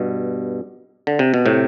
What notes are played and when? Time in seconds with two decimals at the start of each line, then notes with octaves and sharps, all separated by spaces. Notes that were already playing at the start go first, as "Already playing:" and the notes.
Already playing: G2 B2
1.07 D3
1.19 C3
1.34 B2
1.46 A2 C3